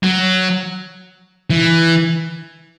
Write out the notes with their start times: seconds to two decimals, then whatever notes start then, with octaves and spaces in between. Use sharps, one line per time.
0.03 F#3
1.50 E3